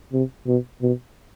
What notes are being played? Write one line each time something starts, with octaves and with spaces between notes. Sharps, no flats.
C3
B2
B2